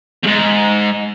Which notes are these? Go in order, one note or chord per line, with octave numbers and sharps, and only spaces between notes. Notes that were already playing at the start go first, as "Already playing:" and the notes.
E2 G#2